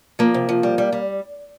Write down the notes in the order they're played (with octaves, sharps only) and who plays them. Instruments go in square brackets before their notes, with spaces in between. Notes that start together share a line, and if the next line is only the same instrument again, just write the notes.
[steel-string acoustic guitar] F3 A#3
C3
F3
G3
G3
G3